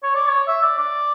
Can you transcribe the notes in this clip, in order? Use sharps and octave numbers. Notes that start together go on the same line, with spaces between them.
C#5
D5
C#5
E5
D5
D5